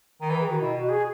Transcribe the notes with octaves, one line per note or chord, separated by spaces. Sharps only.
D#3
E3 B4
G#4
D#3 F#4
B2 E4
B2 F#4
G#4